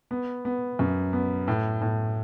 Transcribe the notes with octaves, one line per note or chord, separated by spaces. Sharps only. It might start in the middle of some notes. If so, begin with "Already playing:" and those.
B3
B3
F#2
B3
A2
A2